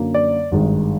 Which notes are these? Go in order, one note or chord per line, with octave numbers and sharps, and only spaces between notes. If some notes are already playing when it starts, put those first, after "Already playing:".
Already playing: F#2 D3 F#3 A#3 C#4
D5
G#1 G2 D#3 G#3